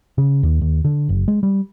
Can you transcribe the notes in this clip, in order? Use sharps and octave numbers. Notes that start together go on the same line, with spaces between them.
C#3
D#2
D#2
D3
F#1
G#3
G3